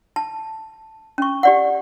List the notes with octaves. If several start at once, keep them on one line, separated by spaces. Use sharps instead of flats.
A5
C#4 C#6
G4 D5 F#5